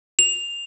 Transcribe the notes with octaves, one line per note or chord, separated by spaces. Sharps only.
F7